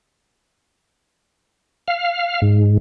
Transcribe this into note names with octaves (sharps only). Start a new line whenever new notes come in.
F5
G#2